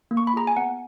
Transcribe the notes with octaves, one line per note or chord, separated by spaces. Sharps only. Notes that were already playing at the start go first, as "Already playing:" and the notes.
A#3
C#6
B5
F4 G#4 A#5
G#5
B3 F#5